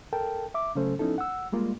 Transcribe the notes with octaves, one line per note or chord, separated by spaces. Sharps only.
A4 A#4 G5 A5
E5 D6
C#3 F#3 A3 C#4 A4 C5
F3 B3 C#4 D#4 E4 A4
F#5 E6
G3 G#3 A#3 F4